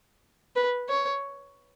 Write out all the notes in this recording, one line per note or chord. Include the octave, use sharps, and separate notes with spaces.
B4
C#5